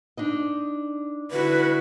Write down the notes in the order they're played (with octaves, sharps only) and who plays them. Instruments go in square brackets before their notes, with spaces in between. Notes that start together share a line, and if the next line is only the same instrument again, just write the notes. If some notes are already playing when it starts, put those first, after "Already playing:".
[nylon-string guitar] D4 D#4 D#5
[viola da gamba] D3 E4 F#4 [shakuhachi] B4